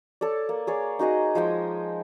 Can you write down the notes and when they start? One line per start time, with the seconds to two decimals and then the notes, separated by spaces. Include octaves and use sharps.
0.21 A4 C#5 D5
0.49 A#3
0.67 G#4 C#5 D5
0.99 D#4 F#4 G#4 D#5
1.35 F3 G#3 G5 G#5